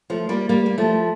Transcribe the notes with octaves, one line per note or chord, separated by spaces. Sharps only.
F3 A3
G3 A#3
G3 A#3
A#3
F3 A3